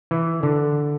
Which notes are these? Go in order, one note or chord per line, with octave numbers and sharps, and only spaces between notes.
E3
D3